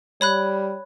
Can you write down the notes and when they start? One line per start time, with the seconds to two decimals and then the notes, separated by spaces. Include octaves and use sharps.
0.21 G3 C#5 B5 F#6